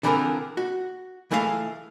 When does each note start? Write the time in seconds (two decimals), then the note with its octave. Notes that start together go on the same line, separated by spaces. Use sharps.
0.03 D3 E3 F3 C4 G#4 A#4
0.57 F#4
1.31 C#2 E3 A3 G#4 A#4 F5